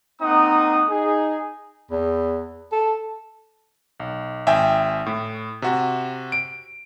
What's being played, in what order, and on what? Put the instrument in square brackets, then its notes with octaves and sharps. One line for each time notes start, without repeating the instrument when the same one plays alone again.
[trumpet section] A#3 C4 D#4 F#5 A#5 D#6
D#4 G#4
[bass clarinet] E2
A4
[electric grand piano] B1
G#1 E5 G5 G#5
A2
C3 F#4
D7